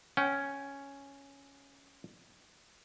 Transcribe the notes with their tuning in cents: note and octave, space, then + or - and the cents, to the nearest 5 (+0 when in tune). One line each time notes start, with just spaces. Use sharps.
C#4 +0 G5 -35